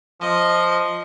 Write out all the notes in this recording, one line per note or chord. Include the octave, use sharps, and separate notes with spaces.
F3 D#5